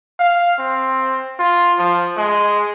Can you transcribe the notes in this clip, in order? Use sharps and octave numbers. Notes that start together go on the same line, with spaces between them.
F5
C4
F4
F3
G#3